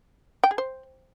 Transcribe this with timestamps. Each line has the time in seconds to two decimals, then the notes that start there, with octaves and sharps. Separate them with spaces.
0.44 G5
0.51 G#4
0.58 C5